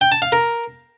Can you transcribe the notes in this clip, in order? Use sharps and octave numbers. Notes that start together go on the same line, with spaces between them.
G5
A5
F5
A#4